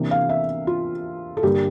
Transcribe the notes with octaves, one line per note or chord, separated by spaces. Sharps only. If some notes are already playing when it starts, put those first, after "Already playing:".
Already playing: C3 E3 A#3 D4
F5
E5
F4
A4
G2 D3 G3 A#3 G4